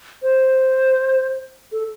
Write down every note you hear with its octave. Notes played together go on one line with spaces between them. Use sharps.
C5
A4